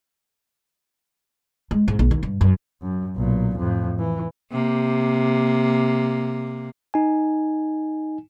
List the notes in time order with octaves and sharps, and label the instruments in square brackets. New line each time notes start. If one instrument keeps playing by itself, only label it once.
[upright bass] G#3
G#2
A#1
D#2
G2
F#2
[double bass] F#2
B1 A#2
F2 A2
E3
[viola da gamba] C3 A#3
[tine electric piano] D#4 G#5